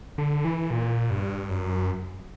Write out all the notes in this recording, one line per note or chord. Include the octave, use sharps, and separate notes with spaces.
D3
E3
A#2
G2
F#2